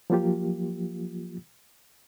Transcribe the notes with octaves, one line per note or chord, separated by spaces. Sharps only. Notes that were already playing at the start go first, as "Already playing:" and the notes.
F3 F#3 A#3 F4 G4